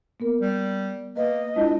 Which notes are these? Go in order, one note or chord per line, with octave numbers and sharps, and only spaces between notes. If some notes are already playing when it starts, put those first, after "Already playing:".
A#3 B3 A#4
G3
A#3 B4 D#5
G#3 D4 E4 F4